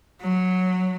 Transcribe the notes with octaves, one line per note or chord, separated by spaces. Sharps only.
F#3